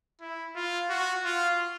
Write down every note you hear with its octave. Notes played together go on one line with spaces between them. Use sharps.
E4
F4
F#4
F4